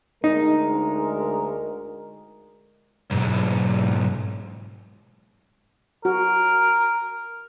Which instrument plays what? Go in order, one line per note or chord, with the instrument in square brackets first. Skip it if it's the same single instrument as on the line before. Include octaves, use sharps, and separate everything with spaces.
[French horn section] D2 G#3 A#4 [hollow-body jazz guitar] D#4
[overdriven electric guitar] B1 G#2
[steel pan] F#4 [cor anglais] A#4